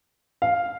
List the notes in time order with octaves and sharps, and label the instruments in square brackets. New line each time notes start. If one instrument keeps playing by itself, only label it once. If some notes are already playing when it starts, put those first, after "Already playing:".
[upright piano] F5